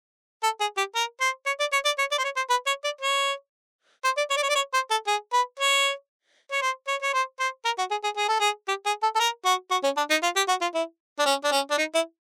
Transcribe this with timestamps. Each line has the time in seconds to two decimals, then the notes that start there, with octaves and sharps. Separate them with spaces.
0.43 A4
0.60 G#4
0.77 G4
0.95 A#4
1.21 C5
1.46 C#5
1.60 D5
1.72 C#5
1.85 D5
1.99 C#5
2.11 D5
2.18 C5
2.24 C#5
2.36 C5
2.50 B4
2.67 C#5
2.84 D5
3.01 C#5
4.04 C5
4.17 D5
4.30 C#5
4.37 D5
4.43 C#5
4.49 D5
4.55 C#5
4.74 C5
4.91 A4
5.07 G#4
5.33 B4
5.59 C#5
6.52 C#5
6.62 C5
6.88 C#5
7.02 C#5
7.14 C5
7.40 C5
7.65 A#4
7.78 F#4
7.91 G#4
8.04 G#4
8.17 G#4
8.28 A4
8.40 G#4
8.68 G4
8.86 G#4
9.03 A4
9.16 A4
9.20 A#4
9.45 F#4
9.71 F#4
9.84 C#4
9.97 D4
10.10 D#4
10.23 F4
10.36 G4
10.49 F#4
10.61 F4
10.74 E4
11.19 D4
11.26 C#4
11.44 D4
11.52 C#4
11.71 D4
11.78 D#4
11.95 E4